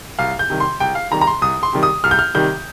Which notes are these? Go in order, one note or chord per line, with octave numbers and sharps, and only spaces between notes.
C2 F5
G6
C3 D#3 G3
C6
C2 G5
F5
C3 D#3 G3 A#5
A#5
C6
C2 D#6
C6
C3 D#3 G3
D#6
C2 F6
G6
F6
C3 D#3 G3 G6